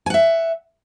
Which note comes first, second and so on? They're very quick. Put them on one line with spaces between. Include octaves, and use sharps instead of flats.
G#5 F#5 E5